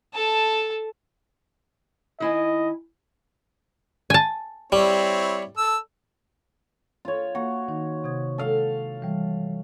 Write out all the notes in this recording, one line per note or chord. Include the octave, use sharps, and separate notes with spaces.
A4 A5
D#3 E4 D#5 G#5
G#5 A5
G3 C4 E4 C#5
A4 E6
F4 C#5
A#3 F#4
D#3 D#4
C3 D#6 G#6
G#3 A4 F5
E3 G3